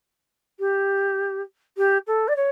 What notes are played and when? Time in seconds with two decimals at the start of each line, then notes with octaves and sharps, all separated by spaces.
0.59 G4
1.77 G4
2.07 A4
2.28 D5
2.36 C#5